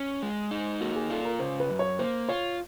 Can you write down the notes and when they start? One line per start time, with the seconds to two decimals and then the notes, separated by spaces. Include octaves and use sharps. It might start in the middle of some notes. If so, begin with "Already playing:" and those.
Already playing: C#4
0.22 G#3
0.51 D#4
0.81 A#3 F#4
0.96 G#4
1.10 F4 A4
1.25 A#4
1.39 C#3 C5
1.60 B4
1.70 F#2
1.79 C#5
1.99 A#3 C5
2.29 F4 C#5